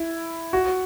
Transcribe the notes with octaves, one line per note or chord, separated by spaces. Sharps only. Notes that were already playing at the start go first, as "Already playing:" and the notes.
Already playing: E4
F#4